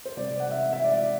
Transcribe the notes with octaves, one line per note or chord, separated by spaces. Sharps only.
C5
C3 G3 D5
F#5
E5
E5
D5